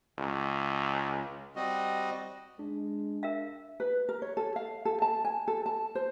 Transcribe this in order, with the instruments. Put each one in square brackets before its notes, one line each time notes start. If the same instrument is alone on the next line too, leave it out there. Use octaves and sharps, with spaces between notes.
[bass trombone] C#2
[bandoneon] G3 C4 F#4 D#5
[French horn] G#3 [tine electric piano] D4
[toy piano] A#4 E5 F5
[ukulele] B4
A#4
C#5
A4
F5
A4
A5
G#5
A4
A5
C5